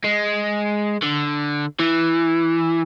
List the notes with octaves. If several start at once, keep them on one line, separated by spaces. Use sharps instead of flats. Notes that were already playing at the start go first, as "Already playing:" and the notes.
G#3
D3
E3